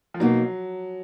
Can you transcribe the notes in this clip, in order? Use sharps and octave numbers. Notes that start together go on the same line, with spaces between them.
F3
B2 F#3 A#3 D#4